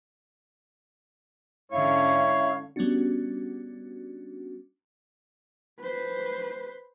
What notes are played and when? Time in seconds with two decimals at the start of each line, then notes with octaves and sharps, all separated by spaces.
1.72 G#2 D3 C#4 E4 C#5 F5
2.76 G3 B3 C#4 D4 F#4
5.81 B4 C5